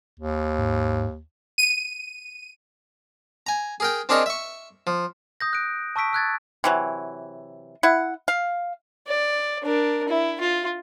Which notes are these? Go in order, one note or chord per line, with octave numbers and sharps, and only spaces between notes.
D#2
G#2
D#7
G#5 A#5
G#4 A#4 G5
C4 D4 G#4 A#4 C#5 D#5
E5 C#6
F3
D#6 G6 A#6
F#6 D7
A5 C#6 E6 B6 D7
E6 F#6 G#6 A6
C3 E3 F#3
E4 F#5
F5
D5
D4 A#4
E4
F4